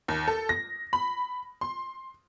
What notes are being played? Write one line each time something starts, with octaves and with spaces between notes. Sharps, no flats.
D#2
A4
A#6
B5
C6